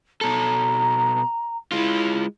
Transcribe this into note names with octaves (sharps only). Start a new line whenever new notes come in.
B2 A4 A#5
G#3 E4 F4